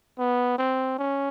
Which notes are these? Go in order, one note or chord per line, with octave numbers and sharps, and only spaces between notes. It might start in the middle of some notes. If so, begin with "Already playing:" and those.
B3
C4
C#4